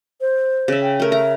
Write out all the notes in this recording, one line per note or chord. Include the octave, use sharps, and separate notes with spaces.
C5
C#3 E5
G5
A3 A#4
E5 A#5